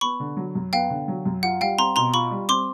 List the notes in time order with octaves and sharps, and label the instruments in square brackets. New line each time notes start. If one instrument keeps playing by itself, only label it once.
[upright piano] B3 [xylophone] B5 C#6
[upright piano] D3
F#3
F#2
[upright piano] B3 [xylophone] F5 G5
[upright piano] D3
F#3
F#2
[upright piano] F4 [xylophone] F#5
[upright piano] G3 [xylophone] F5 G5
[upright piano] C4 [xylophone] A#5 C6
[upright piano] B2 [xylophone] A#5 C6
[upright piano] F4 [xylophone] B5 C#6
[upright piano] G3
[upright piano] C4 [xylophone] C6 D6